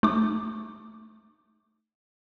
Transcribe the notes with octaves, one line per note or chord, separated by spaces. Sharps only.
A3 D#4 D6